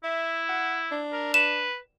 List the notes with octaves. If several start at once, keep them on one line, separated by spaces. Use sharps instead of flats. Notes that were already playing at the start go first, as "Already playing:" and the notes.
E4 E5
F#5
D4
A#4
B4 E7